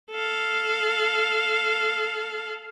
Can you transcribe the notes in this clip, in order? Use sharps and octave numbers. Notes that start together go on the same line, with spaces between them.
A4 F5